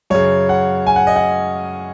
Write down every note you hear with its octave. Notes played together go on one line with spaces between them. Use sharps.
F#2 C#3 C#5
F#5
G#5
F#5
D#5
F#5